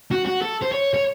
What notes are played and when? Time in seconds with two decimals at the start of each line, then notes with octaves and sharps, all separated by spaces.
0.11 F#4
0.26 F#4
0.42 A4
0.62 C5
0.72 C#5
0.94 C#5